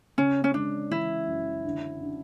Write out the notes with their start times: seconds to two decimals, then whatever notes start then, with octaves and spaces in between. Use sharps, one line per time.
0.18 C#3 C#4
0.44 C#4
0.54 G#3 D4
0.91 E3 E4
1.28 F#2
1.65 D3
2.01 D4